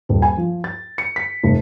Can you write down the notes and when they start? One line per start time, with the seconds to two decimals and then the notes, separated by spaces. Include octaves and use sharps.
0.09 D#1
0.22 G#5
0.37 F3
0.64 A6
0.98 C#7
1.16 B6
1.44 F1